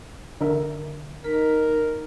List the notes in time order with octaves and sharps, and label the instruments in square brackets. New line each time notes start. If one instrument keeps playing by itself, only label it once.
[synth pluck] D3 A#4 E5
[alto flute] D#4 [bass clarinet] A#4 [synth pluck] B6